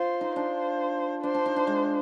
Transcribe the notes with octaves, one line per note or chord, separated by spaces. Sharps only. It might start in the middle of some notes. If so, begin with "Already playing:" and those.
Already playing: F4 C5
D#4
D4 C5
D4 C5
D4
D#4
D4
G#3